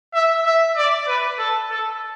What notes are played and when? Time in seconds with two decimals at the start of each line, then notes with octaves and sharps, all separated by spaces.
0.14 E5
0.45 E5
0.77 D5
1.08 B4
1.39 A4
1.70 A4